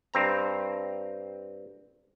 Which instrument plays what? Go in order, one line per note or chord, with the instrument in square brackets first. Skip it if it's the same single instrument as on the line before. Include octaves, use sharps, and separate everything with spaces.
[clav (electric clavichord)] G2 C4 A#5